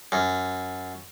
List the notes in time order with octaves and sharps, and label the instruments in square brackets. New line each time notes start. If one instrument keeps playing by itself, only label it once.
[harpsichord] F#2